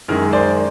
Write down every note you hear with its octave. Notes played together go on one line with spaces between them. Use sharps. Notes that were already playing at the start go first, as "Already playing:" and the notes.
F#2 D#3 G#3 G#4 A#4
C5 D5